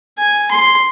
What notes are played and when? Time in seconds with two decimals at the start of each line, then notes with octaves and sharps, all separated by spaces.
0.18 G#5
0.51 C6